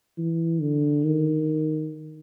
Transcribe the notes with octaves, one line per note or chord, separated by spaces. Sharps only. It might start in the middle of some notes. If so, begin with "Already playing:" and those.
E3
D3
D#3